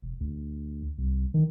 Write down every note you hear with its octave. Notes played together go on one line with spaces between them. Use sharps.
E1
D2
C2
D#3